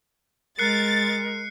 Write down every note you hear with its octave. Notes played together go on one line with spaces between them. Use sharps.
G#3 A#4 F#6 A6 C7 C#7